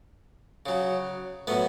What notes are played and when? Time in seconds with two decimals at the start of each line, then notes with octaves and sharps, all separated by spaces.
0.66 C#3 F#3
1.47 A2 F#3 B3